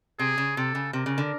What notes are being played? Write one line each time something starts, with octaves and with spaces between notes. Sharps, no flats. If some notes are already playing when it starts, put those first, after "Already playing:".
C3 G#4
C#3
C3 A4
C#3
C3 A#4
C#3
D3